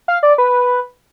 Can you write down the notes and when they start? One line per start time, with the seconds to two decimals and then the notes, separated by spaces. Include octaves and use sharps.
0.08 F5
0.23 D5
0.38 B4